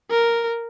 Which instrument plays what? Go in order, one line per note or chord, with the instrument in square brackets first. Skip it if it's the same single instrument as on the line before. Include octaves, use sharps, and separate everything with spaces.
[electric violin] A#4